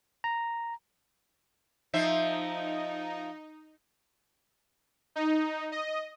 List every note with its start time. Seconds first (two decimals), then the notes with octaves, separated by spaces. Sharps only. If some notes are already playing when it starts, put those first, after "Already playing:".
0.24 A#5
1.94 F3 D#4 C5 E5
5.16 D#4
5.72 D#5